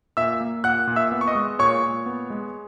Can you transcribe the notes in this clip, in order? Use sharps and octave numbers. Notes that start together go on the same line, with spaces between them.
A#2 E5 E6
A#3
A#2 F#5 F#6
A#2
E5 E6
B3
C#6
D#5 D#6
G#3
A#2 C#5 C#6
A#2
B3
G#3